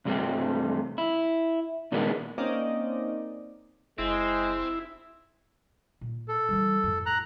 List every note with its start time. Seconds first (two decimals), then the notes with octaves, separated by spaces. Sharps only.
0.05 C2 G2 C3 G3 A3 C4
0.98 E4
1.92 A#2 D#3 G3 G#3 A#3 B3
2.38 A#3 C4 C#4 D#4 D5 D#5
3.98 F#1 G#3 C4 E4
6.01 A#2
6.28 A4
6.49 E3 G3
6.84 F2 A2
7.06 A#5 F#6